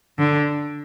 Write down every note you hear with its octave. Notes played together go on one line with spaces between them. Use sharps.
D3